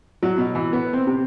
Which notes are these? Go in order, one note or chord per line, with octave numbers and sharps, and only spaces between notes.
F#3
B2
E3
B3
C4
C3